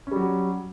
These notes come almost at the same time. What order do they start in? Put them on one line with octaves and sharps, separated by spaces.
C#4 G3 F#3